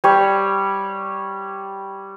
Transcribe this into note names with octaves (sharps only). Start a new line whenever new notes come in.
G3 C#5